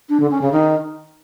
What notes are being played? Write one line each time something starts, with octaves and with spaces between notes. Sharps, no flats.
D4
D3
C#4
C#3
D#3